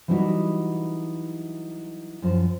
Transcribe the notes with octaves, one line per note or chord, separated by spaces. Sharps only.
E3 F#3 G3 D#4 E4 F#4
F#2 F3